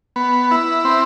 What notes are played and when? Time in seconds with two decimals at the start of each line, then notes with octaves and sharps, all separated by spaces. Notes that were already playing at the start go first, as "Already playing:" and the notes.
0.16 B3
0.51 E4
0.85 C4